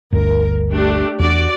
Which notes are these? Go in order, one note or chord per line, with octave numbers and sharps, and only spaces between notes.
G1 D2 G2 A#4
A3 D4 G4
E2 D4 F#4 D5